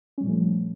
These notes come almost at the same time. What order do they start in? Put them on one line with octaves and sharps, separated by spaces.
C#4 G3 A#2 F3 A3